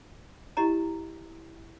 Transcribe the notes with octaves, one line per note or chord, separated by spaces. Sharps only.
E4 G4 D#5 A#5